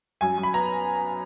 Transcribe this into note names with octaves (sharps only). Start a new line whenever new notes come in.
F#2 G#5
F#2
B5
B3 A#5